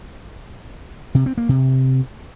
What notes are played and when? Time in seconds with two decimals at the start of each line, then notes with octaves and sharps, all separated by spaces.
1.15 C3
1.26 C4
1.38 A#3
1.49 C3